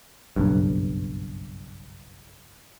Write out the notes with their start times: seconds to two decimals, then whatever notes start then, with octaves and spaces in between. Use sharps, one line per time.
0.36 F#1 B1 G2